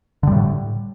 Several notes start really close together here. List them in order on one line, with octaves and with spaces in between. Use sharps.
D3 G3 A2